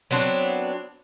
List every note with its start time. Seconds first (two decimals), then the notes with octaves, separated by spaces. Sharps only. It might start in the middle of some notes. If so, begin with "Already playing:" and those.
0.11 F#3 B3 C4 D4